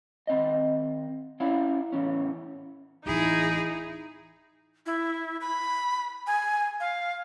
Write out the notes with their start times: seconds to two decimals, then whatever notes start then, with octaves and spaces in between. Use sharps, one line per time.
0.27 D#3 C4 D#5
1.40 C#4 E4 D5 F5
1.92 A2 E3 B3 C#4
3.06 D1 E3 D#4 E4 G#4
4.86 E4
5.41 B5
6.27 G#5
6.80 F5